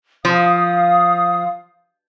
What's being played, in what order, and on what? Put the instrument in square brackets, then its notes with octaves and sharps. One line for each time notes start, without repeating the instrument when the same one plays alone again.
[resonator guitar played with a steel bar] F3 [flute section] F5 D#6